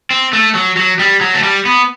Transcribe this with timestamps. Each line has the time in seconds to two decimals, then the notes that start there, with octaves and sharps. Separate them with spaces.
0.11 C4
0.33 A3
0.55 F#3
0.77 F#3
0.99 G3
1.21 F#3
1.34 A3
1.43 G3
1.65 B3